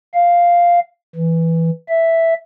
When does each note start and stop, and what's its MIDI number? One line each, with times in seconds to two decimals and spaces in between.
0.14 0.79 77
1.15 1.70 52
1.88 2.33 76